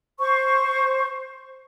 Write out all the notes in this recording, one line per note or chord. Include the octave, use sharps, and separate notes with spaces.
C5 C#6